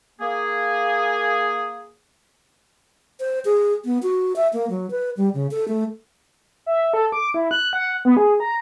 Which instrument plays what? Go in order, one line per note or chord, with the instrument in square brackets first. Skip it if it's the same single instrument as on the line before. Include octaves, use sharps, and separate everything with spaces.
[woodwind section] A#3 G#4
[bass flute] C5
G#4
B3
F#4
E5
A#3
F#3
B4
G3
C#3
A4
A3
[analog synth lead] E5
A4
D6
E4
F#6
F#5
B3
G#4
A#5